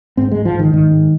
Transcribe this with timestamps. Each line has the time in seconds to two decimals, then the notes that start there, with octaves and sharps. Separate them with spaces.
0.17 G#2 C4
0.31 G#2 G#3
0.45 F3
0.54 G#2
0.59 D#3
0.73 G#2 D#3
0.91 G#2